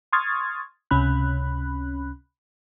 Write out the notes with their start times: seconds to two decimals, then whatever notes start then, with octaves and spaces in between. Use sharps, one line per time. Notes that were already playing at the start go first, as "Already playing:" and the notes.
0.13 C6 C#6 D#6 F6 G#6 A6
0.91 C#2 C3 C#4 B5 F#6